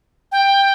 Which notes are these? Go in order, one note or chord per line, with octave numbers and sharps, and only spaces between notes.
G5